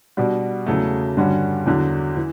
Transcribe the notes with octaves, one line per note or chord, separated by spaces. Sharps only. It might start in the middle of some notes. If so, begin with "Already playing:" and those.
B2 G3 D4 F#4
E2 C#3 F#3 A3
G2 D3 G3 C#4 F#4
E2 D3 F#3
E3